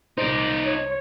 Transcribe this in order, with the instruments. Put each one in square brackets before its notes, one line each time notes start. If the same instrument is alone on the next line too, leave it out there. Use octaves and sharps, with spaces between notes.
[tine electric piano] C2 C5 [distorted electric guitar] D#4 D5
[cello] C#5